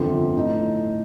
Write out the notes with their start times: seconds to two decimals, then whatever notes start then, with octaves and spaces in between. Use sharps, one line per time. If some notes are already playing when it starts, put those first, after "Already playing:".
Already playing: G1 F2 D3 F3 C4
0.35 A2 A3 D#4